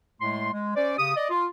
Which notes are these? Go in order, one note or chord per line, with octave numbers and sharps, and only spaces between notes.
A2 G#3 A3 C6
G#3
C#4 C5 D5
C#3 G4 D#6
D5 D#5
F4